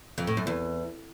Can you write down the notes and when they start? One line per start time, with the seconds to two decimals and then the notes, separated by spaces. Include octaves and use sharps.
0.18 F2
0.27 A2
0.37 F#2
0.47 E2